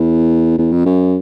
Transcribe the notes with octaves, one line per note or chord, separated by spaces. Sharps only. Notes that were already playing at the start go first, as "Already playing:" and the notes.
Already playing: E2
E2
F2
F#2